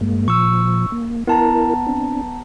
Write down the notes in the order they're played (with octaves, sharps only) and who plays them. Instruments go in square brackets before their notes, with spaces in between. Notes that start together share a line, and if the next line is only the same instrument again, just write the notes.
[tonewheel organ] G2 G#3 A#3
[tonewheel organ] A#2 F3 [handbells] C#6 E6
[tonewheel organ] A#3
[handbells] B3 A5 A#5 [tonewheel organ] E4 A#4
[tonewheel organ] C4 D4